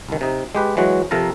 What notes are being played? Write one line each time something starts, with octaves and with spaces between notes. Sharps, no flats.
C2 D#3
C3 D#4
G#3 G4 B4
E3 F#3 G#3 F#4
C3 F3 A4 A#4 A#5